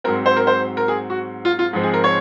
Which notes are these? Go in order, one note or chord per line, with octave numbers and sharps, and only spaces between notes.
G#2 F#3 C4 A#4
C5
A#4
C5
A#4
G#4
F#4
F4
F4
G#2 F3 G#3 C4
G#4
A#4
C#5